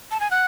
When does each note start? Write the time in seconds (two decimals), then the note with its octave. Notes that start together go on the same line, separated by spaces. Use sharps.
0.11 A5
0.20 G#5
0.31 F#5